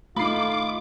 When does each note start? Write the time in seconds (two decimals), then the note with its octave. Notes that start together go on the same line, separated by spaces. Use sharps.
0.16 A3 D#4 F4 B5 D6 C7